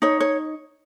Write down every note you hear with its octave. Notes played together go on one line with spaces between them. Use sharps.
D#4 C#5
C#5